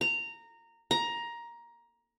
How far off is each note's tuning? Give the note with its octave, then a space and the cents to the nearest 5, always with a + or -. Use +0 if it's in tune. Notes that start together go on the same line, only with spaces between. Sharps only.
A#5 -15
A#5 +15